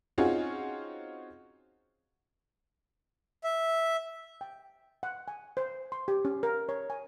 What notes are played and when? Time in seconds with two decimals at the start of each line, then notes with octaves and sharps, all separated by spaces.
0.18 C4 C#4 D#4 F4 F#4 G#4
3.44 E5
4.41 G5
5.03 F#5
5.28 G#5
5.57 C5
5.92 C6
6.08 G4
6.25 C#4
6.43 A#4
6.69 C#5
6.90 G#5